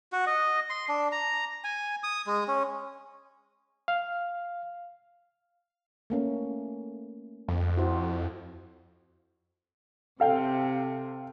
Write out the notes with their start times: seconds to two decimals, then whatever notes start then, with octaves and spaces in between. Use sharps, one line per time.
0.12 F#4
0.27 D#5
0.70 C6
0.89 D4
1.12 A#5
1.64 G#5
2.04 D#6
2.27 G#3
2.48 C#4
3.88 F5
6.10 A3 A#3 C#4
7.48 F2
7.77 E4 F#4 C5
10.20 C3 A4 F5 G5